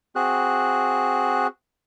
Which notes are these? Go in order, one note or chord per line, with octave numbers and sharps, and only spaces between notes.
C4 F#4 G#4 F#6